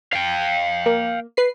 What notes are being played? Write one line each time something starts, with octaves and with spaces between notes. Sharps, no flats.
F5 G5
A#3
B4 C7